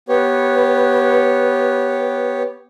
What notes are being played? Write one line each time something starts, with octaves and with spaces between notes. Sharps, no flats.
B3 G4 B4 C#5